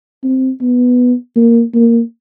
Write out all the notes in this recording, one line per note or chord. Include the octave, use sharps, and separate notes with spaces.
C4
B3
A#3
A#3